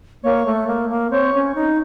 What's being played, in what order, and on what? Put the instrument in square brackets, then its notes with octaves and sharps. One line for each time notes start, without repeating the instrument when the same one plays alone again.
[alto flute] A#3 [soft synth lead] C#5
[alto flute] A3
A#3
A#3
[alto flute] C4 [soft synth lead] C#5
[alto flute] C#4
D#4